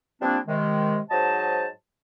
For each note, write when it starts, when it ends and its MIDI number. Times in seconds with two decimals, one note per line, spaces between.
0.21 0.38 53
0.21 0.38 55
0.21 0.38 58
0.21 0.38 60
0.21 0.38 62
0.47 0.99 48
0.47 0.99 51
0.47 0.99 56
1.11 1.67 44
1.11 1.67 54
1.11 1.67 72
1.11 1.67 75
1.11 1.67 81